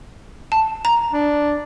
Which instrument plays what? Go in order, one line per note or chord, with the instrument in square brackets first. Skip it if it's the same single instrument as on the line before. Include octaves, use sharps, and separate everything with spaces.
[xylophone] A5
A#5
[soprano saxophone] D4